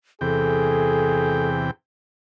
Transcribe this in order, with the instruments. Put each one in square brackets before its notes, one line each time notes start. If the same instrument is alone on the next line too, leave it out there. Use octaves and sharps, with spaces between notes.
[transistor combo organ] E2 C3 G5 [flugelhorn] G#4 [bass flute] A4